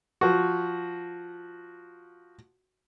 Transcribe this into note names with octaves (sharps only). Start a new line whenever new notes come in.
F3 F#4